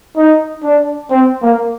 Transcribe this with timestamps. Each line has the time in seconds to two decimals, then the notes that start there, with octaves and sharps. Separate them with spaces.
0.17 D#4
0.64 D4
1.10 C4
1.42 A#3